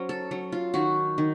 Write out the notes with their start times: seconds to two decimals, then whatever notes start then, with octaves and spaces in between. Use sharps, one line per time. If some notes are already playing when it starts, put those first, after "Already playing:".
Already playing: F#3 C#4 C5
0.09 A4
0.31 F#3
0.52 F4
0.74 D#3 F#4
1.18 D#3